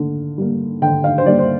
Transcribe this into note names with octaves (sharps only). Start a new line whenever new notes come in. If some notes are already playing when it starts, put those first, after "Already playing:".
Already playing: D3 A#3
G3 A#3
D3 G5
F5
C5
G3 A#3 D5
C5